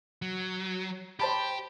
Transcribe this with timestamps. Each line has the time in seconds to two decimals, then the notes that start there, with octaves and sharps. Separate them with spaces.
0.22 F#3
1.20 G4 C5 A5 B5